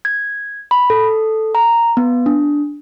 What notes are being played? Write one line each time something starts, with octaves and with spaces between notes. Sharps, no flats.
G#6
B5
A4
A#5
B3
D4